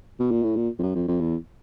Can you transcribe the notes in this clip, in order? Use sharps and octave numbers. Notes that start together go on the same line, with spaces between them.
B2
A#2
A2
A#2
F2
F#2
F2
F2
E2